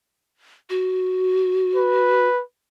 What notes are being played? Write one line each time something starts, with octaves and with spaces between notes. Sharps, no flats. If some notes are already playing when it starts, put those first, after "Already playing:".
F#4
B4